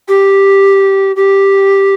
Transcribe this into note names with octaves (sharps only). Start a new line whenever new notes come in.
G4
G4